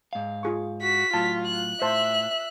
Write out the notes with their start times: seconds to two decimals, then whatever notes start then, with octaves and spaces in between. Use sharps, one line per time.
0.13 G#2 F5
0.43 F4 G#4 C#6
0.82 F#4 B6
1.14 A2 F#3 F4 A5
1.47 F#6
1.82 A2 C5 E5 A5